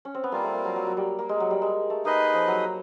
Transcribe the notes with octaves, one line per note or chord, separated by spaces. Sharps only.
C#4
C4
B3
G3 A#3 C4 F4
A3
A#3
F#3
F#3
F#3
G3
A#3
G#3
F#3
G3
G#3
A3
A#3 D#4 G#4 B4 D#5
F3
F#3